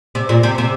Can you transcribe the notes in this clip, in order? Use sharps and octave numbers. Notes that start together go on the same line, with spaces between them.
C3
A#2
C3
C3